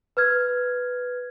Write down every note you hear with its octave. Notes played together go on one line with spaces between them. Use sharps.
B4 F6 G#6